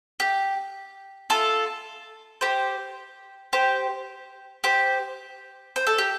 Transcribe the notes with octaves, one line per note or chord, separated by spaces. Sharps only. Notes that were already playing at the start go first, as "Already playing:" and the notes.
G4
F4 A4
G4 C5
G4 C5
G4 C5
C5
A4
G4